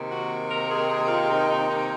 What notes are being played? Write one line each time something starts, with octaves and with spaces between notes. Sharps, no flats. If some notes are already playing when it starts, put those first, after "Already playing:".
Already playing: C3 D#3 A#3
F#4
A#4
G#4
G#4
F4
D#4
D#4
D#4